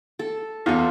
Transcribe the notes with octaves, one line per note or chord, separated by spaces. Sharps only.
A4
E2 F4 A4